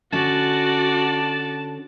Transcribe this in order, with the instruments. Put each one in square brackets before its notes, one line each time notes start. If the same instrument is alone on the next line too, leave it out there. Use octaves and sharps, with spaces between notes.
[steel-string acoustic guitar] D3 C#4 [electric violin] F#4 D5 [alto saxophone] A5